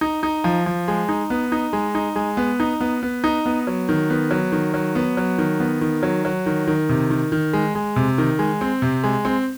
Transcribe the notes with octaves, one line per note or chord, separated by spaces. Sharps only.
D#4
D#4
F3
F3
G#3
D#4
B3
D#4
G#3
D#4
G#3
B3
D#4
B3
B3
D#4
B3
F#3
D#3
B3
F#3
D#3
F#3
B3
F#3
D#3
B3
D#3
F#3
F#3
D#3
D#3
C3
D#3
D#3
G#3
G#3
C3
D#3
G#3
C4
C3
G#3
C4